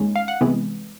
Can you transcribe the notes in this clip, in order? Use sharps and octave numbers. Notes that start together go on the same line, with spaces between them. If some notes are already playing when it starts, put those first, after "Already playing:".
Already playing: D#2 D#3 G#3 C#4
F5
F#5
C2 C3 E3 G#3 B3